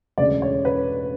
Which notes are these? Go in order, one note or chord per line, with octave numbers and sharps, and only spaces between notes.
E1 D2 C#3 D5
C#5
B4